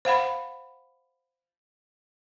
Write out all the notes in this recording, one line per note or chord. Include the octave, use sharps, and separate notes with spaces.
C5 F5 F#5 B5